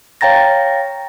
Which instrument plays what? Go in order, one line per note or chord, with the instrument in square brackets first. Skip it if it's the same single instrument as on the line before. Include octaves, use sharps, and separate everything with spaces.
[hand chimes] C#5 F5 G5 A#5 A6 A#6